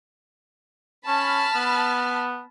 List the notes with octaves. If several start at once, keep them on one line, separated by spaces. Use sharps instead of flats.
C#4 A5 B5 F6
B3